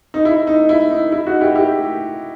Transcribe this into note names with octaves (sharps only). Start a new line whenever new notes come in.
D#4
E4
D#4
E4
D#4
E4
D#4 F#4
E4 G4
E4 G4